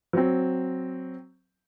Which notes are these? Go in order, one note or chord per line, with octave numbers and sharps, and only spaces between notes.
F#3 C4